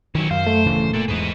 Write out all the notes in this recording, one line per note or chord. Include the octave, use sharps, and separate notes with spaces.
D#3 F#3 C#4 E4
F#2 C5 F5
A3
D1 C#3 E3
A#2 A4 F#5
E2 G#2 B4 D#5